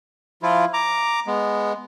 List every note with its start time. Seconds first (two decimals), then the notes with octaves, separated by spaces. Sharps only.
0.42 F3 E4 F4
0.74 A#5 D6
1.27 G#3 B3